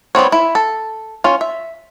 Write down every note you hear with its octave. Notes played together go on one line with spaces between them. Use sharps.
G3 B3 C4 C#5
E4
A4
C#4 F4
E5